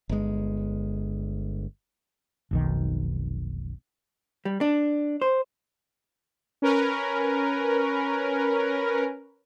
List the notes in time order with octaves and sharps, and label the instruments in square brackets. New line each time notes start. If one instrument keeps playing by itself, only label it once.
[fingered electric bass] G1 G#3
[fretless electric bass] F1 B1 D#3
[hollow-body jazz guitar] G3
D4
C5
[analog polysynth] C#4 A#4 B4